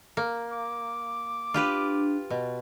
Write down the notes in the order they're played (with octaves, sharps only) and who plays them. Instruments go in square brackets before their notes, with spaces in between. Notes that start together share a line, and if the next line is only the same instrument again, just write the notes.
[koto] A#3
[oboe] D6
[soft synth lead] D4 [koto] F4 G4 B4
[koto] B2